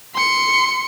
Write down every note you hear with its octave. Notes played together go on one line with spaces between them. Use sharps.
C6 C#7